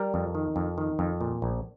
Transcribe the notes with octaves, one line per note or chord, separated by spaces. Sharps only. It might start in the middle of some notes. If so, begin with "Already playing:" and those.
Already playing: G3 A#4
F2
D#3
F2
D#3
F2
A#2
A#1